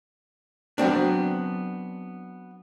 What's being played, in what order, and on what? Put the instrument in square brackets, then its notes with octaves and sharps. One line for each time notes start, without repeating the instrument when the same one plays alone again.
[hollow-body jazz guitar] F#3 B3 C4 D4